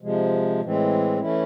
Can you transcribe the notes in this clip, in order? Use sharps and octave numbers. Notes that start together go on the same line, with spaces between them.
C3 F3 G#3
A2 E3 G#3 C4
E3 A3 C#4 E4